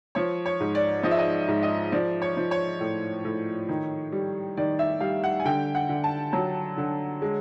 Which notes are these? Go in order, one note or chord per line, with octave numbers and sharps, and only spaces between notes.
F3 C#5
C#5
G#2
D5
F3 D#5
E5
D#5
G#2
D#5
F3 D5
C#5
F3
C#5
A2
A2
D#3
G3
D#3 D5
E5
G3 F5
F#5
G#5
D3 G5
F#5
D3
A5
F#3
D3
G#3